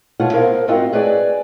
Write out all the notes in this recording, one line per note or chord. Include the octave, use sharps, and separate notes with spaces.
B2 F4 C#5 F#5
A#3 B3 A#4 C5 F5
G#2 C4 F4 F#4 D#5 F5
G#4 B4 C#5 D5 G#5